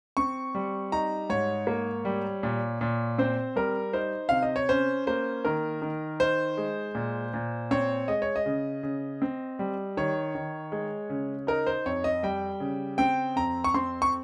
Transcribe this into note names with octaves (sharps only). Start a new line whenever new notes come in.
C4 C#6
G3
D#4 A#5
G#2 C#5
A#3
G3
A#2
A#2
C4 C5
G3 A#4
D#4 C5
C3 F5
D#5
C#5
C#4 C5
A#3 C5
D#3 A#4
D#3
D#4 C5
G#3
A#2
A#2
C4 C#5
G#3 D#5
C#5
D#5
C#3
C#3
C4
G3
D#3 C#5
D#3
G#3
C#3
D#4 A#4
C5
F2 C#5
D#5
G3 G5
C#3
C4 G5
F2 A#5
C#6
C4 C6
C#6